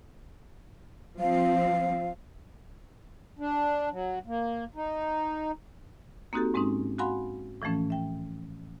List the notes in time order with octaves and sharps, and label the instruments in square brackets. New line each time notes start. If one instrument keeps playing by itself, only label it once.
[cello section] F3 C4 [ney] F5
[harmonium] D4
F#3
A#3
D#4
[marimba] A#3 C4 D#4 F#4 G4 A4
G#2 G#3 C4 C#4 D#4
F#4 F5 F#5 G#5 B5 C6
A2 E3 F3 A3 C#4
E5 G5